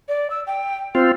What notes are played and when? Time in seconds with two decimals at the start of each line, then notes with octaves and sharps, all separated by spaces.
0.09 D5
0.30 E6
0.47 G5
0.95 C4 F4 C5